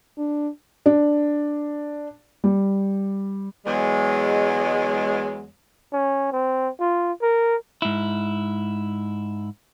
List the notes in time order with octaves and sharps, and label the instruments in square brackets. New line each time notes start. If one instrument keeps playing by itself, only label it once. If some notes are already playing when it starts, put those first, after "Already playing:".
[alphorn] D4
[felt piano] D4
G3
[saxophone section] E2 F#3 G#3
[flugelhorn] C#4
C4
F4
A#4
[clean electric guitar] G#2 E4